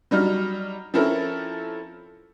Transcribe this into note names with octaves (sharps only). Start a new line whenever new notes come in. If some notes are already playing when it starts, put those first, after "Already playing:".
F#3 G3 D#4 F6
F3 C4 C#4 E4 A4 A#4